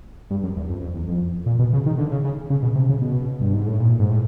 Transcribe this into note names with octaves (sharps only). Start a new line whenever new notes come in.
G2
F#2
E2
F2
F2
E2
F2
A#2
B2
C#3
D#3
D3
C#3
C#3
C#3
B2
C3
C#3
B2
G2
G#2
A2
A#2
G#2
A2